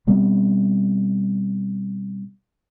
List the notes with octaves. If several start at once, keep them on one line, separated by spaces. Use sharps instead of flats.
B2 G3 B3 C4